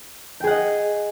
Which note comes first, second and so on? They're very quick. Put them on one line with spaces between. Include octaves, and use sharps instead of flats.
G5 G#4 F#5 D#5